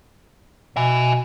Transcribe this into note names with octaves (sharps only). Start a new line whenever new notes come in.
B2 E5 G#5